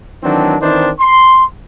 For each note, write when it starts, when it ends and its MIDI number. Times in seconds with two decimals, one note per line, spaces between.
0.23 0.54 51
0.23 0.54 52
0.23 0.54 54
0.23 0.54 60
0.23 0.54 62
0.60 0.89 51
0.60 0.89 52
0.60 0.89 60
0.60 0.89 62
0.60 0.89 63
0.60 0.89 72
1.00 1.42 84